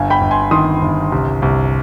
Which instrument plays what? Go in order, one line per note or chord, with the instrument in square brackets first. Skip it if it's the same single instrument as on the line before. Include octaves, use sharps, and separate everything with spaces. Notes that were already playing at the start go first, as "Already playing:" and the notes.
Already playing: [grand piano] G1 F5 G#5
G5 B5
G1
G#5 C6
D#3 C6 D#6
G1
C2
C2